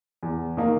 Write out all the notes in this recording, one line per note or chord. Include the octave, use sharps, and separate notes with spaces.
E2
D#3 A#3 D#4